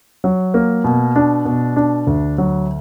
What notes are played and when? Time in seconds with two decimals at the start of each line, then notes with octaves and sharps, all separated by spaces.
0.24 F#3
0.54 A#3
0.84 B2
1.16 D4
1.45 B2
1.76 D4
2.07 D2
2.38 F#3